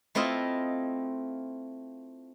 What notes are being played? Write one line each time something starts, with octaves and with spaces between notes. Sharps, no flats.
A3 C4 E4 F4 D#5